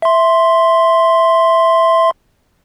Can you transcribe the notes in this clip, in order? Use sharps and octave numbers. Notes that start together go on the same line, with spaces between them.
E5 C6